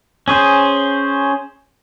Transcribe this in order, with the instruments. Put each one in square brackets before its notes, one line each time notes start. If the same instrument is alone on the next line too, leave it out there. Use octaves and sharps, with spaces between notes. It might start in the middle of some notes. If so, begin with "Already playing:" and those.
[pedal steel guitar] C#4 G#4 C5